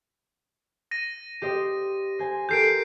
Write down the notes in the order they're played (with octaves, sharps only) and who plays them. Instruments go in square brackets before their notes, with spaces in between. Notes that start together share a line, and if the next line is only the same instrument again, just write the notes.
[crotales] A#6 D#7
[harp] G4 C5 D#5
C5 G#5
[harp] G4 A4 A#4 [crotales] G6 C7 D7